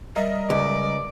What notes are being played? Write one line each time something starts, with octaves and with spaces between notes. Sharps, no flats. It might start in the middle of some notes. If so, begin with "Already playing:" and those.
G3 A#4 D#5 E5
C#2 D5